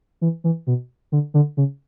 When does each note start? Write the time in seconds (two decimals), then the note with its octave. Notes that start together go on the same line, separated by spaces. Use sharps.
0.21 E3
0.44 E3
0.67 B2
1.12 D3
1.34 D3
1.57 C#3